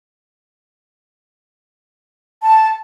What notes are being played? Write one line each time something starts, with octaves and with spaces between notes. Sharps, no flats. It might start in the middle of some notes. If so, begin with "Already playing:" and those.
A5